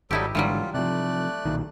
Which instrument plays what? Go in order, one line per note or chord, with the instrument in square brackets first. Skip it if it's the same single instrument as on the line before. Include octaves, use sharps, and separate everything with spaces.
[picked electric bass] G#1 [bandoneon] F#3 G3 A4 [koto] D#4 E4 G4
[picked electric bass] G#1 G#2 D3 [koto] E3 F#3 G3 [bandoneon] F4
[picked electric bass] C3 F3 [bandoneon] A3 D5 F#6
[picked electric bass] B1 A#2 D#3